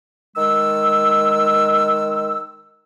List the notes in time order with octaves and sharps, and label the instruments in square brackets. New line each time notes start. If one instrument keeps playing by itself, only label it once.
[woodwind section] D#3 G#3 E6